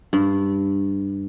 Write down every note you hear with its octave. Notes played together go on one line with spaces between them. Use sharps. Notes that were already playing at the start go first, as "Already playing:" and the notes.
G2